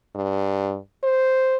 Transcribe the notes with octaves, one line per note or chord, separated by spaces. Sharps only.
G2
C5